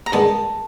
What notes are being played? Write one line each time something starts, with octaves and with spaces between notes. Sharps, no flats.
A#5
G2 D#3 G#3 B3 A5